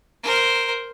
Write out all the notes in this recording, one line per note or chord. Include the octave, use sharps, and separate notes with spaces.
A#4 C5